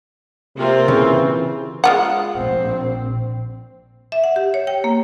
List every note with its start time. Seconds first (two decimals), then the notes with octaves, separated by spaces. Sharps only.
0.57 C3 A#3 C4 F4
0.88 C#3 E3
1.84 G#3 F4 F#5
2.35 A#1 C4
4.12 E5
4.24 F#5
4.36 G4
4.54 C#5
4.67 G5
4.84 A#3